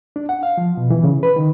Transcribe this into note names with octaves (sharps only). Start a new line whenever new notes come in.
D4
F#5
F5
F3
B2
E3
C#3
B4
D#3